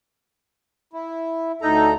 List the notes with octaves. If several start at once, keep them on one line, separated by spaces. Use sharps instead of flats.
E4
D2 D#4 A4 A#5